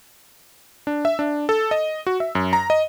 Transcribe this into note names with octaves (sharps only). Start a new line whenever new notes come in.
D4
E5
D4
A4
D#5
F#4
E5
F#2
A#5
D#5